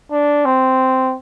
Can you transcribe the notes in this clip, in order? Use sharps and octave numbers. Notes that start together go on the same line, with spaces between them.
D4
C4